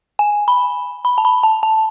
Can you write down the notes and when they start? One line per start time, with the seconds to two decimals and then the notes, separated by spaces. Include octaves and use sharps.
0.19 G#5
0.48 B5
1.05 B5
1.18 A5
1.25 B5
1.43 A5
1.63 A5